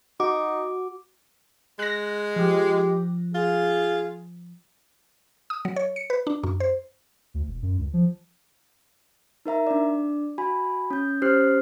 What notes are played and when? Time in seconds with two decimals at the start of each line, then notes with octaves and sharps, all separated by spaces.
0.20 D#4 F#4 D6
1.79 G#3 F#6 A#6
2.36 F3 G4
3.35 F4 G#4
5.50 D#6
5.65 F#3
5.76 C#5
5.96 C#7
6.10 B4
6.27 D4
6.43 F#2
6.60 C5
7.34 D2
7.47 E1
7.62 F#2
7.78 C#2
7.93 F3
9.45 D#4 A#4 E5 A#5
9.67 D4 D5
10.38 F#4 G#5 B5
10.90 C#4 G6
11.22 C#4 G4 C5 F6 F#6 C7